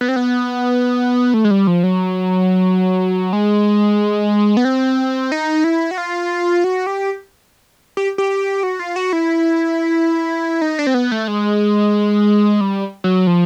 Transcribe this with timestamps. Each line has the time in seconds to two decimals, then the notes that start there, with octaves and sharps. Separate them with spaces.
0.01 B3
0.09 C4
0.16 B3
1.34 A3
1.45 G#3
1.51 G3
1.67 F3
1.83 F#3
3.33 G#3
4.57 B3
4.65 C4
5.32 D#4
5.64 E4
5.91 F#4
5.98 F4
6.64 F#4
6.87 G4
7.97 G4
8.18 G4
8.63 F#4
8.79 F4
8.96 F#4
9.13 E4
10.62 D#4
10.79 D4
10.87 C4
10.94 B3
11.12 A3
11.28 G#3
12.61 G3
13.04 F#3
13.27 F3